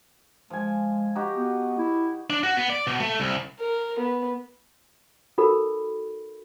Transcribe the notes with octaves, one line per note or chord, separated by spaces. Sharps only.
F3 G#3 G#5
D#4 F#4 G4
B3
E4
D4
F#4
B3
D5
B2
A3
C2
A#4
B3
D#4 F#4 A4 A#4 B5